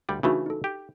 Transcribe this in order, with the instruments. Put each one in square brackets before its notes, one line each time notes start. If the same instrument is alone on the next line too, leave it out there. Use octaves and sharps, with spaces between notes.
[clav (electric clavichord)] D2 G3 D5
[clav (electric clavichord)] C#3 E3 A3 [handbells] D4 D#4 F#4
[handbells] D#4 A4
[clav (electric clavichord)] G4